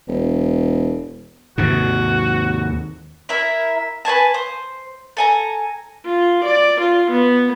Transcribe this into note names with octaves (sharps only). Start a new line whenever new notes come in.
E1
D#2 G#2 C3 F#4
E4 A#4 E5
B4 C5 G#5 A5
C5
A4 G#5 A#5
F4
D5
F4
B3